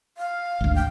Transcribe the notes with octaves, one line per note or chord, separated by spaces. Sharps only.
F5
G#1 D2
G5